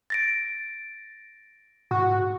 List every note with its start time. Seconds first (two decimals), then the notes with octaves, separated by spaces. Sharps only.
0.10 A6 A#6 D7
1.91 G#2 F#4